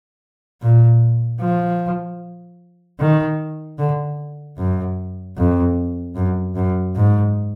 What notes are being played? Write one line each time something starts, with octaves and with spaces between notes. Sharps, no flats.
A#2
F3
D#3
D3
F#2
F2
F#2
F#2
G#2